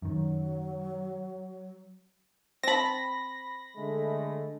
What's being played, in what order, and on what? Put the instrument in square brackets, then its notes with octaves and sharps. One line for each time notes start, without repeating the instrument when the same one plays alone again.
[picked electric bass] F#2 D#3 [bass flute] F#3
[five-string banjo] C4 A5 [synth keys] B5 A#6
[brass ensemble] D3 G#3 A3